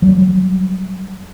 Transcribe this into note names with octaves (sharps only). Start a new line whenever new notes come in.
F#3 G3